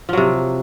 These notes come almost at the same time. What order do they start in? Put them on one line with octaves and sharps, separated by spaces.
F3 F#3 C3